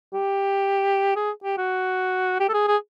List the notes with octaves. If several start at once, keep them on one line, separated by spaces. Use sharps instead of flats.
G4
G#4
G4
F#4
G4
A4
G#4
G#4